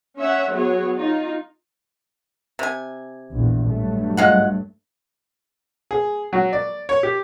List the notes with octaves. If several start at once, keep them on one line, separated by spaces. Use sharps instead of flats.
C#4 C#5 E5 F#5
F#3 B3 G#4 C#5
D#4 F4
C3 G#5
A#1 E2
G2 F#3 A3
G#3 F4 F#5
G#4
F#3
D5
C#5
G4